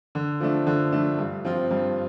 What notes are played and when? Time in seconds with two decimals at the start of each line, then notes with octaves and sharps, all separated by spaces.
0.15 D3
0.40 F3 A3 D4
0.67 D3
0.92 F3 A3 D4
1.18 G2
1.45 F3 C4 F4
1.71 G2